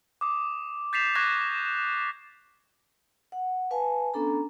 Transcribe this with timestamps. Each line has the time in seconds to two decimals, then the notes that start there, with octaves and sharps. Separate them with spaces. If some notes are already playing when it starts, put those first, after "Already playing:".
0.21 D6 D#6
0.93 G6 A6 B6 C7 E7 F7
1.15 C#6 D6 F#6 G#6 A#6
3.32 F#5
3.71 B4 F5 G#5 A5
4.14 B3 C#4 D4 A4 A#5